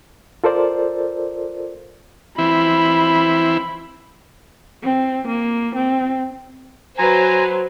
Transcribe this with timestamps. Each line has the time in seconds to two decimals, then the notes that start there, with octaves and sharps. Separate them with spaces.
0.44 F4 A4 A#4 C5 D5
2.38 E3 C4 E4 B5
4.83 C4
5.28 A#3
5.75 C4
6.98 F#3 B4 C5 G#5 A#5